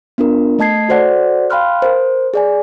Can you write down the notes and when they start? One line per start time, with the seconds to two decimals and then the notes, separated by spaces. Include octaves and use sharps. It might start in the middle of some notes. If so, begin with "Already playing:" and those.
0.18 B3 D4 F4 A#4
0.59 A3 D#5 A5 G#6 C7
0.89 F#4 A4 C5 D5 F#5
1.50 F5 G5 B5 C6 F6 F#6
1.82 A#4 C5
2.34 G#4 D5 G#5